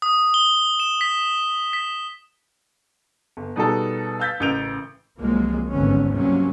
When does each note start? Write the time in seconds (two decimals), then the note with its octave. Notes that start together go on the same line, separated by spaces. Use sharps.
0.02 D#6
0.34 G7
0.80 E7
1.01 B6
1.73 B6
3.37 G1
3.56 B2 G3 D#4 F#4 G#4 A4
4.19 F5 E6 G6 A6 B6
4.40 A1 C#3 A#4 G6 D7 F7
5.19 C2 F3 F#3 G#3 A#3
5.70 G#1 D2 G2 D3 B3 C#4
6.14 G2 C3 F3 F#3 A#3 C#4